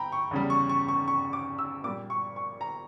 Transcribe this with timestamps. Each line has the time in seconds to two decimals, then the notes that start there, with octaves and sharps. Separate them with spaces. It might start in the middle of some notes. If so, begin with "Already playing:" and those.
Already playing: G5 A#5 B5
0.12 C#6
0.31 E2 C#3 G3
0.50 C#6
0.69 C#6
0.88 C#6
1.08 C#6
1.33 D6
1.59 E6
1.84 A#2 G3 D6
2.10 C#6
2.36 C#6
2.61 A#5